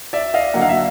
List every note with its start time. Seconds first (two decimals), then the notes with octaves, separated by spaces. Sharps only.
0.13 D5 E5
0.34 D#5 F5
0.54 D3 F#3 A#3 F#5
0.61 F5
0.69 E5